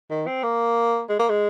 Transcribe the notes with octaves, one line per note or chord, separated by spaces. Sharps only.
D#3
C4
A#3
G#3
A#3
G#3